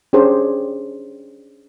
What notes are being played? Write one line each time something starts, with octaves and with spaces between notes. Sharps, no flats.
C#4 D4 G4 G#4 C5